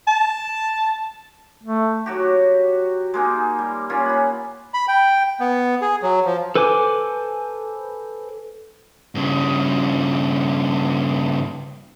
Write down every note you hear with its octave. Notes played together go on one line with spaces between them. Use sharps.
A5
A3
F#3 F#4 G4
G#3 A#3 D#4
G3
A#3 C#4 F4
F#5 B5
B5
G5
B3
G#4
F#3
F3
A4 B4 C5 G#5 D6
G2 C#3